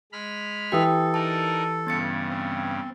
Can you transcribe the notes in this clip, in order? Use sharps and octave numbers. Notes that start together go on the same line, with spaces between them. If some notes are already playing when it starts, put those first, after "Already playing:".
G#3 B5 F6
E3 G4 A4 G5 D#6
D#4 A#4 D5 A5
G2 C#3 B3 A6 C#7
C4